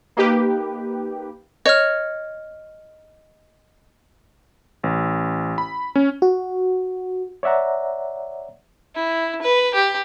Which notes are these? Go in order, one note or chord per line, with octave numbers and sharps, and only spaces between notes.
A#3 D#4 G4 B4
C#5 D#5 F6
A1
B5
C#4
F#4
C#5 D5 E5 F#5 A#5
E4
B4
G4